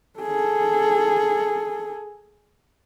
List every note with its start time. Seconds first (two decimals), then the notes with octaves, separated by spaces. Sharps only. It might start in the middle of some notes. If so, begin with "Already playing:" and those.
0.19 G#4 A4